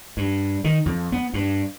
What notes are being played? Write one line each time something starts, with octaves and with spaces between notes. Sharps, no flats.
G2
D#3
F2
B3
G2